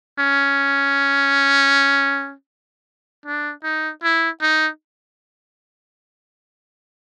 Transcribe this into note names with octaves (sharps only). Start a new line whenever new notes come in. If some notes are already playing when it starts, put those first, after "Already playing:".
C#4
D4
D#4
E4
D#4